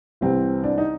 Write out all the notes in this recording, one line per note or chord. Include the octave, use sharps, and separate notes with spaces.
C2 C3 E3 C4
D4
D#4